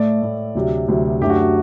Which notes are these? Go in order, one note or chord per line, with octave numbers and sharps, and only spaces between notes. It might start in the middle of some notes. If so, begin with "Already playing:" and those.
Already playing: A2 A3 D5
A2 A3
D2 C3 F#3
D2 C3 F#3
F#2 D3 F#3 A3 G4
F#4
G4